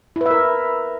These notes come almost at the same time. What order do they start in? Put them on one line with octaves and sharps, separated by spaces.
E4 B4 E5 A#4